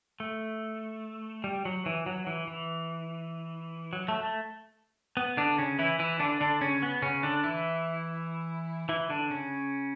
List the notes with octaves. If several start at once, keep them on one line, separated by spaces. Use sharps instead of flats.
A3
G3
F#3
E3
F#3
E3
E3
F#3
A3
A3
B3
D3 D4
C#3 C#4
E3 E4
E3 E4
D3 D4
D3 D4
C#3 C#4
B3
C#3 C#4
D3 D4
E3 E4
E3 E4
D3 D4
C#3 C#4